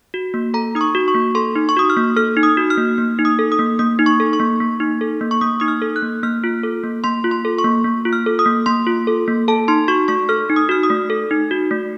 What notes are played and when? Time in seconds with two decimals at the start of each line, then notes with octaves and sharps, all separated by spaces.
0.14 F#4
0.34 A#3
0.54 A4 A#5
0.75 D#4 D#6
0.81 C#6
0.95 F#4
1.08 C#6
1.15 A#3
1.35 A4 C6
1.56 D#4
1.69 C#6
1.77 F#4 D#6
1.90 F6
1.96 A#3
2.16 A4 F6
2.37 D#4
2.43 D#6
2.57 F#4
2.70 F6
2.78 A#3
2.98 A#3
3.19 D#4
3.25 D#6
3.39 A4
3.52 D#6
3.59 A#3
3.79 A#3 D#6
3.99 D#4
4.06 C#6
4.20 A4
4.33 C#6
4.40 A#3
4.60 A#3
4.80 D#4
5.01 A4
5.21 A#3
5.31 C#6
5.41 A#3 D#6
5.60 D#4 D#6
5.68 F6
5.82 A4
5.96 F#6
6.02 A#3
6.23 A#3 F6
6.44 F4
6.63 A4
6.84 A#3
7.04 A#3 C6
7.24 F4
7.31 C6
7.45 A4
7.58 C#6
7.64 A#3
7.85 A#3
8.05 F4
8.13 F6
8.26 A4
8.39 D#6
8.46 A#3
8.66 A#3 C6
8.87 F4
9.07 A4
9.28 A#3
9.48 A4 A5
9.68 D#4 C6
9.88 F#4 C#6
10.08 A3 C#6
10.29 A4 F6
10.49 D#4
10.56 D#6
10.69 F#4 F6
10.83 D#6
10.90 A3
11.10 A4
11.31 D#4
11.51 F#4
11.71 A3